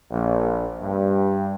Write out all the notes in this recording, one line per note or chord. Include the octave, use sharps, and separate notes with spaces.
A#1
G2